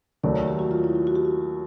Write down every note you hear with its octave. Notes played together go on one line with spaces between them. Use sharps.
D#2 D#3 F#3 A3 D5
C#5
G4
F#4
F4
E4
F4
F#4
G4
F#4